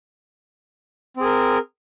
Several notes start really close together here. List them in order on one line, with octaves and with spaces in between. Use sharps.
C4 G#4 A#4